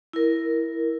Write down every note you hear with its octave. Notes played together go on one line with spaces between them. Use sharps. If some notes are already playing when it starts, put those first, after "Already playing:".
E4 A#4